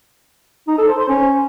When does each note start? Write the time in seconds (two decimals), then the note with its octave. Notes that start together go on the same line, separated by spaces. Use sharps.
0.68 D#4
0.78 A4
0.88 C5
0.99 C5
1.09 C#4